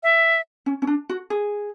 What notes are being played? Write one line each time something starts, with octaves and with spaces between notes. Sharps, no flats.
E5
C#4
C#4
D4
F#4
G#4